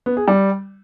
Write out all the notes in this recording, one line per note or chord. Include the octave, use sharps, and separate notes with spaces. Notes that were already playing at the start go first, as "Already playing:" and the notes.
B3
G#4
G3